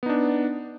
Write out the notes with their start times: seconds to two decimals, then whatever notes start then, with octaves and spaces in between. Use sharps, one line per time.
0.03 B3
0.06 D#4
0.09 D4